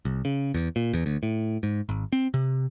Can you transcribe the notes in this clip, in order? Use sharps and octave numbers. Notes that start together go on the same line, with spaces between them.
C2
C#3
E2
A#2
E2
D2
A2
G#2
G#1
C4
C3